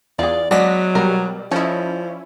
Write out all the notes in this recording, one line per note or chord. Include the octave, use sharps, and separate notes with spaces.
E2 F4 G#4 D5
F#3 G#3 B3 D4 D5 A#6 B6
B2 G3 A#4
F3 C#4 E4 A4 D#5